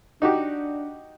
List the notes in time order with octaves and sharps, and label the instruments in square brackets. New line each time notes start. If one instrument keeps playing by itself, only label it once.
[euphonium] D4 [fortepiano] D#4 F#4 G4